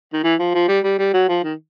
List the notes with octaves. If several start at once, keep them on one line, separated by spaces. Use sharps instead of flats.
D#3
E3
F3
F3
G3
G3
G3
F#3
F3
D#3